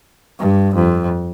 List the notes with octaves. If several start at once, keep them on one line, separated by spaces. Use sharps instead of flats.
G2
F2